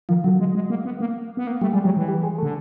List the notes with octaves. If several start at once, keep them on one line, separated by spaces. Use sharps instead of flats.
D#3 F3
D3 F#3
G#3
G#3
A#3
B3
A#3
B3
A#3
G3 A3
G3 G#3
F#3 G3
E3
G3
G#3
A3
D3